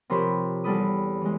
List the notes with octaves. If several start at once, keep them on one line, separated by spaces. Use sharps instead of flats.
C3 F3 A#4 C5 C#5 B5
E2 G3 A4 B4 D#6
E3 G#3